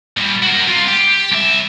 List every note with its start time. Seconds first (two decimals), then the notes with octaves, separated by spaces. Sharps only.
0.17 A#2 G3
0.42 F#4 A#4
0.67 C2 F4
0.88 G4
1.31 C2 E5